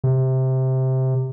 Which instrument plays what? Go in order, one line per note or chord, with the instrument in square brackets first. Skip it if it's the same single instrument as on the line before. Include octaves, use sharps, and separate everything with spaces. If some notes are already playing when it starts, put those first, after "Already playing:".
[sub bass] C3